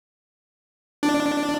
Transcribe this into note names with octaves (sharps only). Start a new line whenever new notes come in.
D4